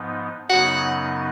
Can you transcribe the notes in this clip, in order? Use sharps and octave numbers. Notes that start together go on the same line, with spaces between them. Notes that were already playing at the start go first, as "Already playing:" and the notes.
Already playing: G#2 F3 B3 D#4
F#2 C#3 F#3 B3 D#4 F#5